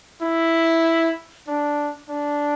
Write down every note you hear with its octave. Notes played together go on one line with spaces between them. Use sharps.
E4
D4
D4